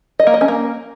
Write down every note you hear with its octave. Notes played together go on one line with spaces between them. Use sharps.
D#5
A#3
D#5
C#4
A#3